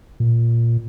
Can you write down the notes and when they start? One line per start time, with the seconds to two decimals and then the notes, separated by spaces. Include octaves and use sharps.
0.20 A#2